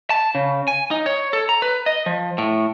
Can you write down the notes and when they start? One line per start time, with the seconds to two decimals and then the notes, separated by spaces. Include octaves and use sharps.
0.10 A5
0.35 C#3
0.68 G#5
0.91 D#4
1.06 C#5
1.33 A4
1.49 A#5
1.62 B4
1.86 D#5
2.06 F3
2.38 A2